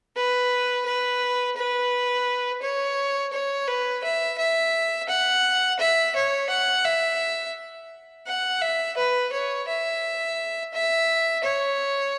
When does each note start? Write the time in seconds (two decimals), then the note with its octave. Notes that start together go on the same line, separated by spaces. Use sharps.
0.16 B4
0.86 B4
1.56 B4
2.62 C#5
3.33 C#5
3.68 B4
4.04 E5
4.38 E5
5.09 F#5
5.80 E5
6.15 C#5
6.50 F#5
6.85 E5
8.27 F#5
8.62 E5
8.97 B4
9.32 C#5
9.68 E5
10.74 E5
11.44 C#5